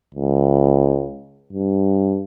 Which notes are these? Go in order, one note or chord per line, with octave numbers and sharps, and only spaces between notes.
C#2
G2